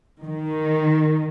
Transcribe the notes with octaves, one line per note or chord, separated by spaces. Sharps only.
D#3